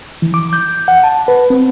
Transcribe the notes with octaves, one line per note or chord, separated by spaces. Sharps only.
E3
D6
G6
F#5
A5
B4
C4